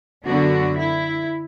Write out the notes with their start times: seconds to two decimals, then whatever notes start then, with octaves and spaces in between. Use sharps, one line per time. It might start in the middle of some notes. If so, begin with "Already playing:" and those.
0.25 F#2 D3 B3 D4 F#4
0.77 E4